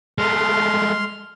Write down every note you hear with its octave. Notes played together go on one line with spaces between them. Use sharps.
G#3 A3 C6 F6